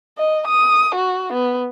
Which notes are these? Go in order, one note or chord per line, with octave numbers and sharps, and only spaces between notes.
D#5
D#6
F#4
B3